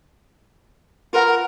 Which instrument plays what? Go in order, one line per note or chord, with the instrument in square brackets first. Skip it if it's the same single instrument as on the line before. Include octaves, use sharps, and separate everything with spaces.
[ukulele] F4 B4 F#5 [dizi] A#4